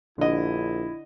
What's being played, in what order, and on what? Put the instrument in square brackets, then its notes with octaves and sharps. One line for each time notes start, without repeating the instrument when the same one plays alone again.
[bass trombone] A#1 [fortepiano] D3 D#5 [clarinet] E4